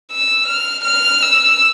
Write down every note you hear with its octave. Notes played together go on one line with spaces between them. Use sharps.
E6
F6
F6
E6